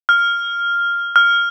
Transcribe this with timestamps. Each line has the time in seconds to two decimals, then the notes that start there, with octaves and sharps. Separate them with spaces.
0.09 F6
1.16 F6